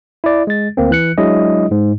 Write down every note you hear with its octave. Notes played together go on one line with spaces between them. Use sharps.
E4 D5
G#3 A6
D2 A#3 C4
E3 F#6 C#7
F#3 G#3 D4 E4 G#4 D#5
G#2